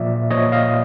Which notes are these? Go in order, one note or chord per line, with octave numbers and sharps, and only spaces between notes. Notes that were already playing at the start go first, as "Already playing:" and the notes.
Already playing: A#2 F3 D5 E5
A#2 F3 C#5 D#5
D#5 F5